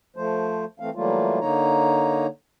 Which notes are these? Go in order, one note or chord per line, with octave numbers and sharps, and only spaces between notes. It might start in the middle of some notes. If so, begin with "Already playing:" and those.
F3 A3 C5
E3 A3 C4 F5
E3 F#3 G3 A3 A#3 F4
D3 A#3 D#4 C#5 A#5